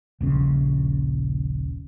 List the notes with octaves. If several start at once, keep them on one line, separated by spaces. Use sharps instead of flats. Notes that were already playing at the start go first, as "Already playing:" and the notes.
D#1 A#1 C#3